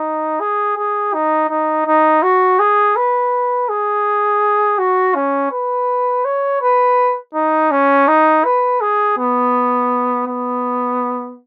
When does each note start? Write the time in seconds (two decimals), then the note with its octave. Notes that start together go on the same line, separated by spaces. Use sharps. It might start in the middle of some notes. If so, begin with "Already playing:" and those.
Already playing: D#4
0.40 G#4
0.77 G#4
1.14 D#4
1.50 D#4
1.86 D#4
2.23 F#4
2.59 G#4
2.96 B4
3.69 G#4
4.78 F#4
5.15 C#4
5.52 B4
6.25 C#5
6.62 B4
7.34 D#4
7.71 C#4
8.08 D#4
8.45 B4
8.81 G#4
9.18 B3
10.27 B3